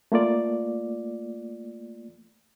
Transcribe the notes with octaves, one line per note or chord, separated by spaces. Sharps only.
A3 A#3 F4 D5